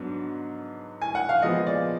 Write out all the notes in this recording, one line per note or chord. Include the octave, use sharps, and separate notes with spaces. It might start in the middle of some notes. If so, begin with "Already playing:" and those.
Already playing: G#2 F#3 B3 D4
G#5
F#5
F5
A#2 F3 G#3 B3 D#5
D5